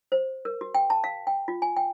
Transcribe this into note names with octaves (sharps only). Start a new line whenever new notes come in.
C5
A#4
F#4
G5
A5
F5
G5
F4
G#5
G5